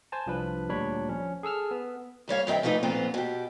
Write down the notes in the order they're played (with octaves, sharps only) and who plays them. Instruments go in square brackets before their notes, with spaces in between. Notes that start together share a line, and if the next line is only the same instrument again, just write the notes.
[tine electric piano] C5 G#5 A5
C2 F3 D4 B4
D2 A#2 G3 D4 C#5 B5
F3 C#4
G#4 A4 E6 F6
B3
[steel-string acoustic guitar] E2 G3 C#5 F5
G2 D#3 C4 E5 G5
E3 F3 A3 D#4 B4
F2 A#2 B3 C4 F4
B2 G4